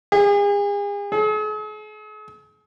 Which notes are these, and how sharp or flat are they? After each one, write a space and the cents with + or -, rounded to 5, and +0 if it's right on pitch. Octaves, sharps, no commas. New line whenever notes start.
G#4 -40
G#4 +45